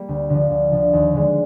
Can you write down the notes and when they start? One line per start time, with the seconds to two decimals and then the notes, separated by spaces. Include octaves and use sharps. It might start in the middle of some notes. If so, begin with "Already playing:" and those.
Already playing: G3 A#3
0.09 D2
0.30 D3 F3
0.50 D2
0.72 D3 F3
0.93 D#2
1.14 D3 G#3